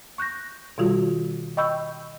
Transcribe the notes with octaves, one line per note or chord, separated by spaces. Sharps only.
C#6 F#6 G6 A#6
B2 D#3 G3 F4 F#4
D#5 G5 B5 C#6 E6 G6